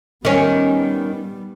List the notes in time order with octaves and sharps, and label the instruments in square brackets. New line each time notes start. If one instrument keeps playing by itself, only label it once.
[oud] D#3 C#4 [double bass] G3 B3